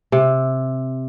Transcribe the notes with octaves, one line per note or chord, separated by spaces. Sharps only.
C3